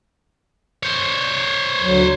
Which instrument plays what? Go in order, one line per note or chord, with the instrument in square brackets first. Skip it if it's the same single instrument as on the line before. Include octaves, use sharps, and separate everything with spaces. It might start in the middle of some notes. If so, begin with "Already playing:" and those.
[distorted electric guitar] C5 C#5
[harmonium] D2 F#3